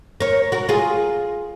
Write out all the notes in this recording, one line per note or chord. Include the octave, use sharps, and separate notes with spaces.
A#4 C#5
F#4 A#4
F4 G#4